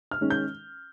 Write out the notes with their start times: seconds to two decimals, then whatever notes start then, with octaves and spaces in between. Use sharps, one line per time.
0.11 F6
0.21 D#3 G#3 C#4
0.30 G6